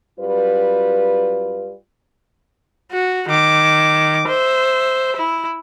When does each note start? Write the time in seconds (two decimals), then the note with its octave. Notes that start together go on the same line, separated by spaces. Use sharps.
0.19 F#2 G3 F4 B4
2.92 F#4
3.28 D#3 D6
4.28 C5 E5
5.16 E4